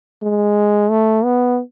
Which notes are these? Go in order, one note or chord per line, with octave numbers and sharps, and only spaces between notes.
G#3
A3
B3